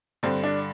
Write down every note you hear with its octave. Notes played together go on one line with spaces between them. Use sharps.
G2 D3 C4
D4